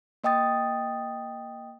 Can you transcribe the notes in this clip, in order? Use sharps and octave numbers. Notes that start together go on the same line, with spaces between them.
A#3 D#5 G5 D#6 A6